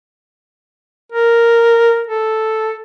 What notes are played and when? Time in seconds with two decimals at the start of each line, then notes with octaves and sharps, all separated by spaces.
1.12 A#4
2.07 A4